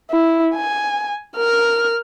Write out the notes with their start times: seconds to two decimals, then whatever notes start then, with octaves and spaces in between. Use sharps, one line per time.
0.11 E4
0.55 G#5
1.37 A#4 F6